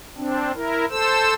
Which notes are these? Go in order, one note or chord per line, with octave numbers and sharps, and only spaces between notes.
C4 D4
E4 A#4
A4 C5 E6